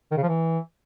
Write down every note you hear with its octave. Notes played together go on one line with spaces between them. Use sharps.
D#3
C#3
F3
E3